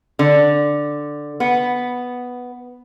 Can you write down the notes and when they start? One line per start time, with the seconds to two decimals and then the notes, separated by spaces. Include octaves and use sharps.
0.19 D3
1.40 B3